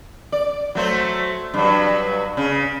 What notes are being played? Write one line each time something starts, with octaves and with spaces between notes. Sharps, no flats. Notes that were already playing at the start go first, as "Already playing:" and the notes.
D5
F#3 A3 C5
G2 F#3
C#3